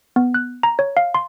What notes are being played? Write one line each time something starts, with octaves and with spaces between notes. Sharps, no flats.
B3
F#6
A#5
C#5
F5
C6